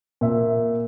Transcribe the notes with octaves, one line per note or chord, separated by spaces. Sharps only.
A#2 E5